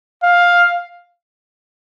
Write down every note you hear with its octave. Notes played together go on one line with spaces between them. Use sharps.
F5